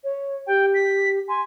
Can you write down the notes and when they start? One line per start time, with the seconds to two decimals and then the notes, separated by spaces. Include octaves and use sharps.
0.04 C#5
0.47 G4 G5
0.74 B6
1.28 G#5 C6